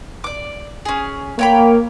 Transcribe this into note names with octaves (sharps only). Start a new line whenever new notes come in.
D5 D6
C#4 G#4
A#3 C#5 G5 B5